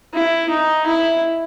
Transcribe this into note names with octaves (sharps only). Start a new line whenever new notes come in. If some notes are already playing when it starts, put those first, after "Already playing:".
E4
D#4
E4